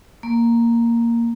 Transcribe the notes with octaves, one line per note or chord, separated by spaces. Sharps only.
A#3